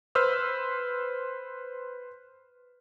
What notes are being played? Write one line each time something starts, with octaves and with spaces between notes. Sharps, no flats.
B4 C5 E6 F6